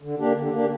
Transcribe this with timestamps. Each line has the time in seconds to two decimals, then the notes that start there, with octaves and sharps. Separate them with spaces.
0.02 D3
0.19 A#3 D4 G4
0.36 D3
0.52 A#3 D4 G4